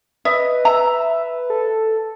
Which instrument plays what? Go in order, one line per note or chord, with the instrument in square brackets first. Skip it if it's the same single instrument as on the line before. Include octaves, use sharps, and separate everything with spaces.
[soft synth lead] B4 [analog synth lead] D#5 [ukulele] E5
[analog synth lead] E5 [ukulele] A#5
[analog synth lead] A4